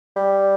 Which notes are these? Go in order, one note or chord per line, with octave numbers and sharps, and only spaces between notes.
G3